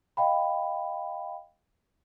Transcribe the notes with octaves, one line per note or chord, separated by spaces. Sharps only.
D#5 F5 G5 B5